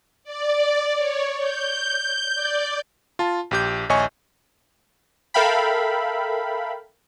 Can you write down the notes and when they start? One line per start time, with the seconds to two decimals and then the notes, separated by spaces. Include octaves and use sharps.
0.24 D5
0.96 C#5
1.39 G6
2.35 D5
3.19 F4 A5
3.51 A#1 G4 G6
3.89 A#1 D#2 C#5 D#5 G#5 C#6
5.34 A4 A#4 E5 F5 G5 B5